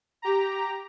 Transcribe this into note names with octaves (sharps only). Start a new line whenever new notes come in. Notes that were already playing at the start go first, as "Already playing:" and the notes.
G4 A#5